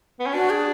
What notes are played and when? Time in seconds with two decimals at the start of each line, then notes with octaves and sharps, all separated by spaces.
0.20 B3
0.26 C#4
0.33 D4 F#4
0.50 G#4